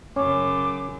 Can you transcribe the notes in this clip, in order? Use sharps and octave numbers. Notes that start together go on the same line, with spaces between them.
F#2 C#3 C#4 G#5 D6